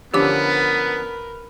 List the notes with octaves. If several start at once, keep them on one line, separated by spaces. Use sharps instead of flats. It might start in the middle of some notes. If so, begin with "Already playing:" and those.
D3 F3 B3 C#4 G4 A#4 B4 D6